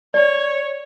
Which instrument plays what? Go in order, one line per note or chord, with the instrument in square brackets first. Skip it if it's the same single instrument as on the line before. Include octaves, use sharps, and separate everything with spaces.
[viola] C#5 [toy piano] D5